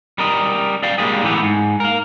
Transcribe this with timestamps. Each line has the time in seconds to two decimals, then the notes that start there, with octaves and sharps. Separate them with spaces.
0.18 G3 A#4 D#5
0.83 D5 F5 G5
0.98 G3 G#3 A#3 G4 G#4
1.23 A2 E3 B3 G4
1.42 G#2
1.80 A#4 F5